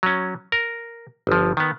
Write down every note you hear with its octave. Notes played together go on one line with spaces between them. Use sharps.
F#3 C#4
A#4
G1 F3
D#3 B3